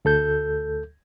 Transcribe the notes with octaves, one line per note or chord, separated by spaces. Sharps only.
D2 A4 G6